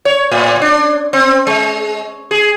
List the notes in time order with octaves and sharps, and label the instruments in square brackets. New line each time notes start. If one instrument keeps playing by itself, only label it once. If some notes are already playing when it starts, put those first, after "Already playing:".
[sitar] C#5
A2
D4
C4
G#3
G#4